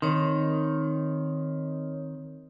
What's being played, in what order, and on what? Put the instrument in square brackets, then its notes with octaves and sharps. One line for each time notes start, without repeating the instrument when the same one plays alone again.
[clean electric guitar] D#3 [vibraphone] C4 C#5